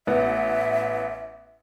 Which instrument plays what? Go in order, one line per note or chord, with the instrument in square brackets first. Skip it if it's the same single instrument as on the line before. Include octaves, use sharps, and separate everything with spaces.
[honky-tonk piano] A1 B3 [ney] E5